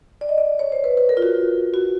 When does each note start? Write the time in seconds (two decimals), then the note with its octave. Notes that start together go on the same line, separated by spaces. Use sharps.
0.21 D5
0.29 D#5
0.38 D5
0.59 C#5
0.72 C5
0.84 B4
0.97 B4
1.09 A#4
1.17 F4
1.22 F#4
1.74 F#4